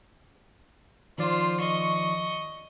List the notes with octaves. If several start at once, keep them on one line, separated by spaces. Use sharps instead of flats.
D#3 F3 F4 C5 D5
D#5 C#6